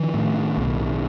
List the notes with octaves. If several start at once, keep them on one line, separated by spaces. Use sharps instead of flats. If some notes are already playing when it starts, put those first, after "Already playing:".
Already playing: D#3 F3
A2
B1